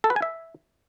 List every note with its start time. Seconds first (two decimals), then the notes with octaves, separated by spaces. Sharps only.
0.04 A4
0.10 B4
0.16 G#5
0.22 E5